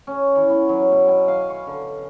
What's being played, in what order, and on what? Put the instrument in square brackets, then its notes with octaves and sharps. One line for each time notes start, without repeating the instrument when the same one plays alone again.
[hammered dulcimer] C#4
E3
B3
F#3
B2
G#5
F5
C#6
D3